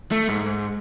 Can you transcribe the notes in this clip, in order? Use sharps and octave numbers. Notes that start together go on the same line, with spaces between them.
A3
G#2